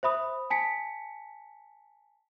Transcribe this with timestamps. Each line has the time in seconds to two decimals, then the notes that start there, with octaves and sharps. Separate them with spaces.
0.03 C5 E5 B5 D#6
0.50 G#5 A5 B6 C#7